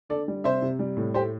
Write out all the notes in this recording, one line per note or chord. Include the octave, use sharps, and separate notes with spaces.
D3 A4 D5
G3
C3 C5 E5
C3
G3
A2
A3 G4 C5